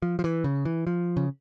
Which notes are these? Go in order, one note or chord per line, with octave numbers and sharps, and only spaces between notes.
F3
F3
E3
C#3
E3
F3
C#3